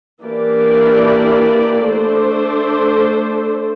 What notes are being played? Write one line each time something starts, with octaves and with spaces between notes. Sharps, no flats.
E3 A#3 D4 G4 D5
A3 D4 A4 C5